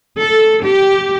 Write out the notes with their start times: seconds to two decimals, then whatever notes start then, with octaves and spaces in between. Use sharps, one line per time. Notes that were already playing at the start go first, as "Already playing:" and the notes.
0.20 A4
0.64 G4